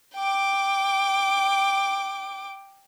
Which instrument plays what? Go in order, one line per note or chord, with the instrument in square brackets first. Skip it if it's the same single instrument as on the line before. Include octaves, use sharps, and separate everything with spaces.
[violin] G5 D6